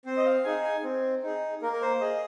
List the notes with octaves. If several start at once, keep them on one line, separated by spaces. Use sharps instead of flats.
C4 C5
D#5
F5
D#4 G#4 G#5
G#5
C4
D#4 G#4
A#3 A#4
A#4
C5
G#4 D#5